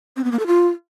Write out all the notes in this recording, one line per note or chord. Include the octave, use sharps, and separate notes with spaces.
C4
B3
A#3
A4
F4